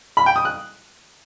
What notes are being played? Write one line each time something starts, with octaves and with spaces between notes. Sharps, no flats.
B5
G5
D#6
F#6